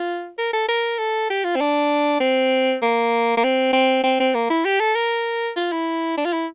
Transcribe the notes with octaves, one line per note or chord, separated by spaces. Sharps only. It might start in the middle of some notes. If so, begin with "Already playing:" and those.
Already playing: F4
A#4
A4
A#4
A4
G4
F4
C4
D4
C4
A#3
A#3
C4
C4
C4
C4
A#3
E4
G4
A4
A#4
F4
E4
D4
F4
E4